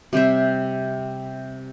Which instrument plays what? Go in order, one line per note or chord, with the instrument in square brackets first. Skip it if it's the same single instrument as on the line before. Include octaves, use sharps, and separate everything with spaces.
[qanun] C3 G3 C5 E5